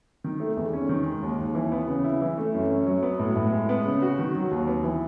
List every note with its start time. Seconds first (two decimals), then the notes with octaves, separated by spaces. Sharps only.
0.24 D#3
0.40 A3
0.57 E2
0.74 C#4
0.89 D#3
1.06 G#3
1.22 D#2
1.38 D#2
1.55 E3
1.72 B3
1.88 C#3
2.04 E4
2.21 E3
2.38 A3
2.54 F#2
2.70 C#4
2.87 F#3
3.03 B3
3.19 A2
3.36 A2
3.52 G#3
3.69 B3
3.86 C#3
4.02 F#4
4.19 D#3
4.35 F#3
4.51 D#2
4.67 B3
4.83 E3